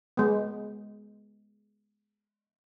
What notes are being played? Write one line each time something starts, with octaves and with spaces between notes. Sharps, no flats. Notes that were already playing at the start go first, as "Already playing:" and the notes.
G#3 B3